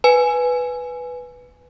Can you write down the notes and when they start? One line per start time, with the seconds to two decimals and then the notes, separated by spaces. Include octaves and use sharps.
0.04 B4 G#5